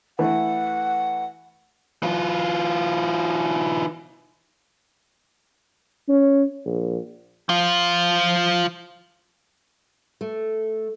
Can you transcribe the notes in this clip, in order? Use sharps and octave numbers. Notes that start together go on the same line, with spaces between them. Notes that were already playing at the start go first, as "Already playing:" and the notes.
E3 A3 E4 F#5
E3 F4
C#4
A#1
F3 F4
A3